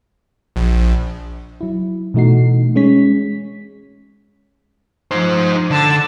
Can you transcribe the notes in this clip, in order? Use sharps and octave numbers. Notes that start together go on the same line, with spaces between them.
A#1
F#3 E4
B2 E3 A3 D#4 F#4 C7
G#3 C#4 C#5 B6
F3 D#4 C5
D3 A5 E6 A6